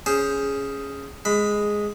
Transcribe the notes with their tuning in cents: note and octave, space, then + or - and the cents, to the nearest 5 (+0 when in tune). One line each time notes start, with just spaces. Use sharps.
C#4 +0 G#4 +0 C5 +0
G#3 +0 B5 +20